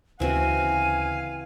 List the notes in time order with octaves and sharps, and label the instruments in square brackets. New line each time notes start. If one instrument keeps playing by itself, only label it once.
[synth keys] D2 C#3 [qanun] E3 C4 F#4 [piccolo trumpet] F5 [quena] G#5